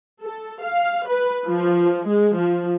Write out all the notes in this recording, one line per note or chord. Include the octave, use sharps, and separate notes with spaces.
A4
F5
B4
F3
G#3
F3